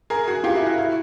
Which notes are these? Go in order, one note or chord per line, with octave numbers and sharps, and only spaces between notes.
G#4 A#4
F#4 G#4
F4 G4
E4 F#4
E4 F#4
E4 F#4